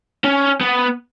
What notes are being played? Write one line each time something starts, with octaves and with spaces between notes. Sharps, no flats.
C#4
B3